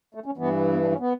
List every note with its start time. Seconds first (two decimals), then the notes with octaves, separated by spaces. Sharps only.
0.15 A3
0.26 C#4
0.37 G2 E3 B3
0.73 B3
0.82 D4
0.92 C#4
1.00 B3